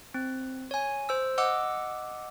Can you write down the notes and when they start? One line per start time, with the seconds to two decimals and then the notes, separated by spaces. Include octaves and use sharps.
0.14 C4
0.71 C#5 G#5
1.09 C5 E6
1.38 D#5 F#5 D6 E6